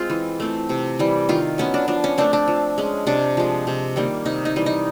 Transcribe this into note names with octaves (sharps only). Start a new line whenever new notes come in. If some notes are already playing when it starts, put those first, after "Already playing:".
Already playing: G#3 C4 F4
E3
A3 C4
C3
E3 G3
D#3 F4
F#3 B3 C#4
D4
F3 D4
C#4
A3 C4 D4
D4
F3
G#3 C#4
C3 D4
F3 G#3
C3
D#3 G3 A#3
C3 D#4
D#4
E3 G3
D#4